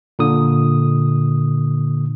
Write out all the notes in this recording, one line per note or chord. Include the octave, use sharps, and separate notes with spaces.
A#2 D3 D#6